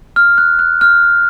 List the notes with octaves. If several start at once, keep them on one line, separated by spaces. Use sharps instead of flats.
F6
F#6
F#6
F6